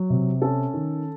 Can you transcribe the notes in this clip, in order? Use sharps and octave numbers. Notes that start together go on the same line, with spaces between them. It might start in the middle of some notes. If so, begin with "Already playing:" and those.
Already playing: F#3
C3
C#4 A4
D#3